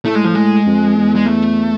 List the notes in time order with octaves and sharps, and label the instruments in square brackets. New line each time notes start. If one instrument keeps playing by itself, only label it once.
[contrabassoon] A2 [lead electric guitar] A3
[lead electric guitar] G#3
F3
G#3
[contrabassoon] F2
E2
[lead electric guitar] G#3
A3